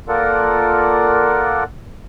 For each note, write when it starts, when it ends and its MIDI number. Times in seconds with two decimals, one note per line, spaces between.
0.08 1.63 58
0.08 1.63 65
0.08 1.63 69
0.08 1.63 70
0.08 1.63 74
0.08 1.63 78